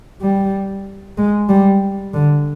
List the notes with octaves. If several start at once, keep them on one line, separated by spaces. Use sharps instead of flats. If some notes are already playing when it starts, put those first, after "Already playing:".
G3
G#3
G3
D3